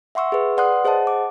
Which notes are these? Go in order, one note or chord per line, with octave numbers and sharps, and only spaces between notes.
E5 F#5 C6 C#6 E6
G#4 B4
B4 D5 F#5 C6 D#6 F#6
G#4 C5 D#5 F#5 A5
D6